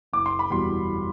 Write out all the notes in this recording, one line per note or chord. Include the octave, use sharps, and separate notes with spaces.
F#1 D6
C6
B5
E2 B2 G3 C6